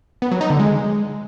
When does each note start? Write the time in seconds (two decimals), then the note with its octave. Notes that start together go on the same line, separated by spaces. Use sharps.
0.22 B3
0.31 F#3
0.41 D#4
0.50 D3
0.60 G#3